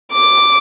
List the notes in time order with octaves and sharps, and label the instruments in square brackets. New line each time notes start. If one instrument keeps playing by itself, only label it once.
[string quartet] D6